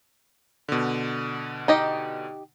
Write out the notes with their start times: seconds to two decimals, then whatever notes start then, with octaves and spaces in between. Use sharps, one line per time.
0.69 B2 D3
1.68 D#4 G4 D#5